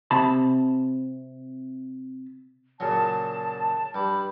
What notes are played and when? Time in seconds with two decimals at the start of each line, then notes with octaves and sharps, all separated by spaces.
0.11 C3 A5 B5
2.80 A#2 C#3 F#3 A5
3.95 G2 B5 D6